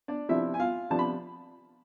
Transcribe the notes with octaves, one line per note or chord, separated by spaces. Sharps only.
D4 D5
C3 F3 B3 D4 E4 E5
G#5
F4 F5
C3 F3 B3 D4 A5
B5